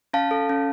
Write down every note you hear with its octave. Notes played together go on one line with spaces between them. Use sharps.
C#4 F5 A5
A4
C#4